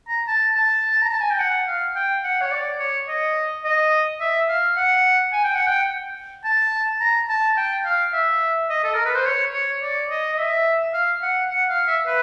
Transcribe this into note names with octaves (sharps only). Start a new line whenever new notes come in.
A#5
A5
A5
A#5
A5
G#5
G5
F#5
F5
G5
F#5
C#5
D5
C#5
D#5
D#5
E5
F5
F#5
G#5
G5
F#5
G5
A5
A#5
A5
G5
F5
E5
D#5
A4
A#4
B4
C5
C#5
C#5
D5
D#5
D#5
E5
F5
F#5
F#5
F5
E5
B4